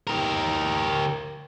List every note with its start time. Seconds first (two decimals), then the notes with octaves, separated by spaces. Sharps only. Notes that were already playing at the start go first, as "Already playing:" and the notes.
0.07 G4 A#4